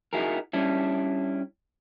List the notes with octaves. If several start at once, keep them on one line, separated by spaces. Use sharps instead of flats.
D#4 E4 F#4 G#4 A#4
G3 C#4 D4 E4